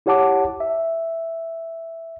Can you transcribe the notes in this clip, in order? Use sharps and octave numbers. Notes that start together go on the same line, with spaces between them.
E4 G4 C#5 F#5 A5 D6
E5